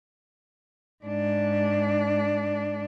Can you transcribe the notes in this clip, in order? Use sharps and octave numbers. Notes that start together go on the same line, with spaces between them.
G#2 D4